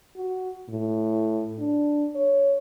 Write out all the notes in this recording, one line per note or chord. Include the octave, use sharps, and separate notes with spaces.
F#4
A2
D4
C#5